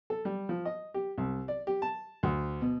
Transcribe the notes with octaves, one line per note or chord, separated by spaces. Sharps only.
A4
G3
F3
D#5
G4
C2
D5
G4
A5
D2
B2